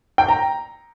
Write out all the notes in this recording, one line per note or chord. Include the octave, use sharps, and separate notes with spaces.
G5
A#5